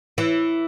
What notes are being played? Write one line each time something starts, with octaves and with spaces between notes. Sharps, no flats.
E3